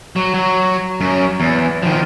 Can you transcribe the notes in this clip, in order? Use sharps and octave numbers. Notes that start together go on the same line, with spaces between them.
F#3
F#3
F#2 F#3
E2
D#3 F3